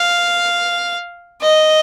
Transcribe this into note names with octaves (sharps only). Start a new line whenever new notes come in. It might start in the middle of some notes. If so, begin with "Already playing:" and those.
Already playing: F5
D#5